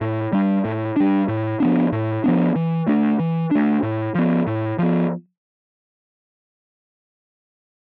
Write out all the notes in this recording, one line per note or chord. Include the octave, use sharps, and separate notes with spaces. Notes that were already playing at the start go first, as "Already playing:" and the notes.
A2
G3 D4
A2
G3 D4
A2
F3 B3 D4
A2
F3 B3 D4
E3
A3 D4
E3
A3 D4
A2
F3 B3
A2
F3 B3